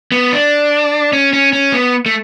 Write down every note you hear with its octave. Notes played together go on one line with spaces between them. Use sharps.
B3
D4
C#4
C#4
C#4
B3
A3